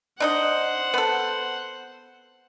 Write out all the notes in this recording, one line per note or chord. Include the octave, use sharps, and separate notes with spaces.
D4 D#4 C5 D#5 F#5
B3 A4